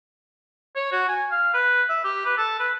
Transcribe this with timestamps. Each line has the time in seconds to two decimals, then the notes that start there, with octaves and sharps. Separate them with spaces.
0.75 C#5
0.92 F#4
1.08 G#5
1.31 F5
1.54 B4
1.89 E5
2.04 G4
2.25 B4
2.37 A4
2.59 B4